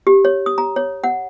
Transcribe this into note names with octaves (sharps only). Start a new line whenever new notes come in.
G4
C#5
D#6
A#5
C#5
F#5